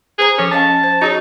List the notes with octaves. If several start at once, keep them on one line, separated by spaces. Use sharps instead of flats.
G#4 B4 C5 A#5
F3 C#4 A4
C#4 D#5 F5 A5
C5
D#4 F#4 G#4 C#5